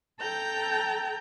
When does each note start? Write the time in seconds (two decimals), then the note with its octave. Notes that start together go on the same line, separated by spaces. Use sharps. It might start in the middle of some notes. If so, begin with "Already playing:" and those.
0.19 A4 G5 A#5 G6